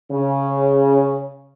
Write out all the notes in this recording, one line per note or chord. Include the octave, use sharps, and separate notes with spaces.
C#3